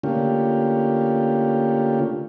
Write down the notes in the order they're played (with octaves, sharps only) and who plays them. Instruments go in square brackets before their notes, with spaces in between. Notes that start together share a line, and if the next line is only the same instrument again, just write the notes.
[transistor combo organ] D3 A3 A#3 C#4 F4 G4